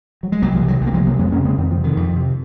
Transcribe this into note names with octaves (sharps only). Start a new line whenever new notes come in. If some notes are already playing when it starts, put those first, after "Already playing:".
F#3
G#3
C2 F#3 A#3
F3 G#3
C3
D#3 F#3
C2
A#3
F3 G#3
C3
F#3 A#3
F2 G#3 C4
A#3 C#4
C#3
G#3 C4
F2 D#3
F3
C3
D#3
F2
C3